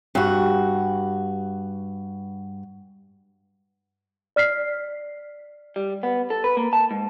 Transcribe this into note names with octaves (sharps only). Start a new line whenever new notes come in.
G2 F#4
D5 F6 B6 C7
G3
B3
A4
B4
A#3
A5
G#2